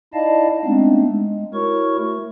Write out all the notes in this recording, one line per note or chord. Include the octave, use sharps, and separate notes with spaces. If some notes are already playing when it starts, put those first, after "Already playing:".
D#4 E4 D5 D#5 F5 A5
G#3 A3 B3 C4 D4 D#4
G#3
E4 F#4 A#4 C#5 C#6
A3